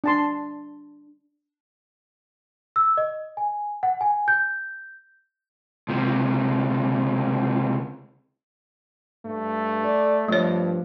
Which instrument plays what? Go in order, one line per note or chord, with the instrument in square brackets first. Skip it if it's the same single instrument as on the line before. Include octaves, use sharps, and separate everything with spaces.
[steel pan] D4 A5 C6
[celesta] E6
D#5
G#5
F#5
G#5
G6
[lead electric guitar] C#2 C3
[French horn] G2 [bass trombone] A3
[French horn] D5
[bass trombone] G2 [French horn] F3 [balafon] A3 C#5